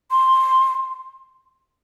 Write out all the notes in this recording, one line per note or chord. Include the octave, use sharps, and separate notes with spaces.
C6